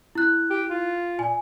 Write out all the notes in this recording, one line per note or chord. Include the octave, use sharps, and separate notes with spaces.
E4 F#6
G4
F4
A#2 G#5